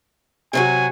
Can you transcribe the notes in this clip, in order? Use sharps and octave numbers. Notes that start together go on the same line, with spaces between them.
C3 F#3 F#4 G#5